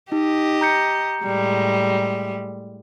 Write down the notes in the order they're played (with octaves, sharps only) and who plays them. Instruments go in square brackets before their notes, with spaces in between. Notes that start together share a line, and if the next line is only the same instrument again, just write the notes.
[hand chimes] D#4 [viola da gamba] G4 D#5
[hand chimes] A#5 G6 C#7
[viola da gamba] A2 G3 G#3